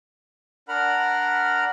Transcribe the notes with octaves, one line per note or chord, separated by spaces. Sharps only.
D4 A#4 F#5 B5 F6